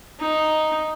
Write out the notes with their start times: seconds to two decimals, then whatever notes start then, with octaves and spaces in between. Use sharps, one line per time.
0.20 D#4